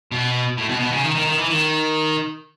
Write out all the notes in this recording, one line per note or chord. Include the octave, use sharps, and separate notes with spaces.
B2
A2
B2
B2
C#3
D#3
D#3
D#3
E3
D#3